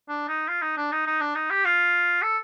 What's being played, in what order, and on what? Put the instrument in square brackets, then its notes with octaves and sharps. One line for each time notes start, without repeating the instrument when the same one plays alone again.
[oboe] D4
D#4
F4
D#4
D4
D#4
D#4
D4
D#4
G4
F4
A4